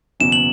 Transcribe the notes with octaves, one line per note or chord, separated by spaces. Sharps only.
F#1 E2 B2 F#3 C#4 E7
F#7